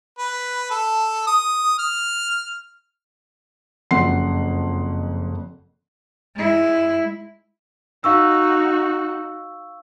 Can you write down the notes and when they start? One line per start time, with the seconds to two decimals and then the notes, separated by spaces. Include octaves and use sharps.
0.18 B4
0.70 A4
1.27 D#6
1.78 F6
3.91 F#1 F2 F#5 C6 C7
6.36 G#3 E4
8.04 D#4 F#4 F5 C#6 E6